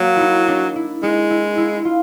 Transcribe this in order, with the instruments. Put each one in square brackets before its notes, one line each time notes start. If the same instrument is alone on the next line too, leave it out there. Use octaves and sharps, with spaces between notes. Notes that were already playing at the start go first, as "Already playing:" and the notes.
Already playing: [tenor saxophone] F#3 [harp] A#3
[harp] D#4 E4
D4
E4
[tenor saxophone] G#3 [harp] D#4
[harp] E4
E4
F4